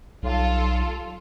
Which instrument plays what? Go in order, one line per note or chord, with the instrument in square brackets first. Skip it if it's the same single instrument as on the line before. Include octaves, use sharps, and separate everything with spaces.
[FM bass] B1 [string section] G3 F4 A4